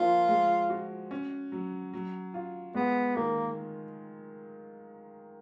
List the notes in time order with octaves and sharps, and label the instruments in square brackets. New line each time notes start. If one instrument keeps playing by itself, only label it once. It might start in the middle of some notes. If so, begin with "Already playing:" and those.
Already playing: [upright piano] F3 A#3 [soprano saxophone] F4
[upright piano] G#3
F#4
C#4
F#3
F#3
F4
[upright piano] G#3 [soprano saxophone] B3
[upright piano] D#3 [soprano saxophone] A#3